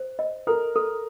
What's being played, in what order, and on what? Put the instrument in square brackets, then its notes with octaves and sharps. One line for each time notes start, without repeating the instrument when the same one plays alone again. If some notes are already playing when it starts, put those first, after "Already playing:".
Already playing: [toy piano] C5
D#5
[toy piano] A4 [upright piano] A#4
[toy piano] A4